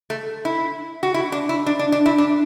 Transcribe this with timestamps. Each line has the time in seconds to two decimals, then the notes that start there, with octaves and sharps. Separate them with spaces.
0.10 A3
0.45 E4
1.03 F#4
1.14 E4
1.32 D4
1.49 E4
1.66 D4
1.79 D4
1.92 D4
2.06 E4
2.18 D4